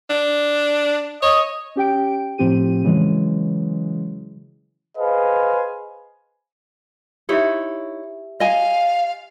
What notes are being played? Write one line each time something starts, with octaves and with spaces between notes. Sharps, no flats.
D4
C#5 D#5
C#4 G4 G5 D7
A2 F3 C4 G4 D#7
C#3 E3 F#3 G#3
G#4 B4 C5 D#5 F5 G#5
D#4 E4 G4 C#5 E5
D#5 F5 G#5